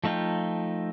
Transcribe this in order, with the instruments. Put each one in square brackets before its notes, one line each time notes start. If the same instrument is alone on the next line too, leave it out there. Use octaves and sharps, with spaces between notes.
[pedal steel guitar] F3 A3 D#4 F4 G5